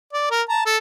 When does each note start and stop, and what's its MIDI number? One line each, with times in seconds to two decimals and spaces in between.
0.13 0.27 74
0.30 0.42 70
0.49 0.62 81
0.49 0.62 82
0.66 0.77 69